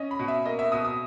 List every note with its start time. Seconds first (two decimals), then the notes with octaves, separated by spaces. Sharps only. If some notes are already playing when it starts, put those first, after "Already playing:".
Already playing: C#4 D#5
0.11 B5
0.19 B2
0.28 E5
0.45 A#3 D#5
0.59 E5
0.72 B2 D#6
0.85 D#6